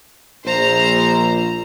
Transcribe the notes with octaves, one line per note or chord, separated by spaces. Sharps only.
A#1 C5 A#5